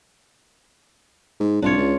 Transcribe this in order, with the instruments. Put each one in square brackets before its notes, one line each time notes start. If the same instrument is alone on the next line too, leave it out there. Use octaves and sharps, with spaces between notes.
[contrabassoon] G#2
[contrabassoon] C2 [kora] D4 F4 C#5
[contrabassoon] C#2